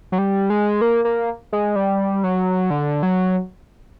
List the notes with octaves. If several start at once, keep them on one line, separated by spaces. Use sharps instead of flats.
F#3
G3
G#3
A#3
A#3
G#3
G3
F#3
D3
F#3